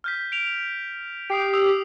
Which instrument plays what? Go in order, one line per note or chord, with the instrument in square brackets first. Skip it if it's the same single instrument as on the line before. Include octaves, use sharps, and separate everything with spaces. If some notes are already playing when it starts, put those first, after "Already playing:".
[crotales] F6 G6 B6
D7 F7
[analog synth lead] G4 [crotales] D#6 C7 D7
[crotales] D#6 E6 F7